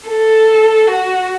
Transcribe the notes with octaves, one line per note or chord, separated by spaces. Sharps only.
A4
F#4